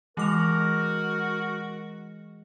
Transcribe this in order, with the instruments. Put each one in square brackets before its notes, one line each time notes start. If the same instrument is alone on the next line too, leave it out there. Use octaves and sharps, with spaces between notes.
[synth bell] E3 D6 F7 [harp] G#3 [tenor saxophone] F#4 [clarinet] A#4